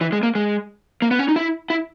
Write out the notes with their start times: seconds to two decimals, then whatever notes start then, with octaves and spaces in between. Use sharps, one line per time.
0.01 E3
0.12 G#3
0.23 A#3
0.35 G#3
1.02 A#3
1.11 B3
1.19 C#4
1.28 D#4
1.36 E4
1.70 E4